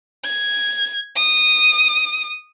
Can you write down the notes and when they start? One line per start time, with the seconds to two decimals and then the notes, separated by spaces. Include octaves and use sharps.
0.24 G#6
1.16 D#6